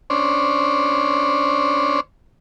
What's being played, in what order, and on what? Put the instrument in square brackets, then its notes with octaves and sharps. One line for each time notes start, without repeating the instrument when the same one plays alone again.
[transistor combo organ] C#4 D4 C5